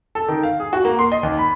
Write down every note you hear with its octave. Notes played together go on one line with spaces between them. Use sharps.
A4
D#3
F5
G#4
F#4
A#3
C6
D#5
D#2
B5